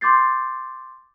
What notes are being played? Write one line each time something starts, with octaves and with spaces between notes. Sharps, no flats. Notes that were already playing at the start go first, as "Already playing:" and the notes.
C6 D6 G6 A6 C7